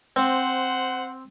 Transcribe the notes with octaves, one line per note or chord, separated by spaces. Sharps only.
C4 C5 F#5